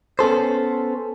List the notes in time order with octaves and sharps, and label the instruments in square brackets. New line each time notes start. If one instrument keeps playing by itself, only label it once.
[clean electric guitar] B3 C#4 A4 C5